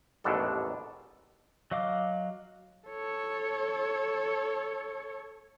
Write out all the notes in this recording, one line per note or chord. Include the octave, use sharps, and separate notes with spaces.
A1 D#2 G#2 B2 D4 A4
F#3 D#5 F5 D6
A4 C#5